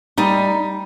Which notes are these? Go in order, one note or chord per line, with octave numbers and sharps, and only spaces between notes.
G3 D#4